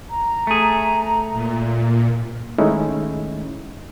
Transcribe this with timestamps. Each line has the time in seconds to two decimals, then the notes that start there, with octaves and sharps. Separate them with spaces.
0.10 A#5
0.47 A3 G#4
1.31 A#2
2.58 D#3 G#3 A3 C#4 D#4 E4